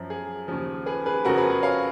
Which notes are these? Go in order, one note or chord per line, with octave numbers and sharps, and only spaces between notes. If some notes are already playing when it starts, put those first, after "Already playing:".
Already playing: F#2 F3
G#4
D#2 C#3 F3
G#4 B4
G#4 B4
F2 C#3 F3 F#4 A#4
G#4 B4
G#4
C#5 F5